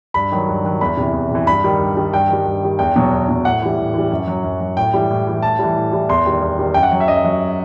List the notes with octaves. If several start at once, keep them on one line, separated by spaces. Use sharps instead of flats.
G2 B5
D#3 F#3
G2
D#3 F#3
E2 B5
C3 E3
E2
C3 E3
G2 B5
D#3 G3
G2
D#3 G3
G2 G5
D#3 G3
G2
D#3 G3
E2 G5
B2 F#3
E2
B2 F#3
A2 F#5
E3 G3
A2
E3 G3
F#2
F#3
F#2
F#3
A2 G5
E3 G3
A2
E3 G3
A2 A5
E3 G3
A2
E3 G3
E2 C6
D#3 G3
E2
D#3 G3
F#2 G5
F#5
F#3
E5
F#2 D#5
F#3